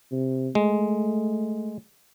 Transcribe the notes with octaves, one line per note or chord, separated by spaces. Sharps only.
C3
G#3 A3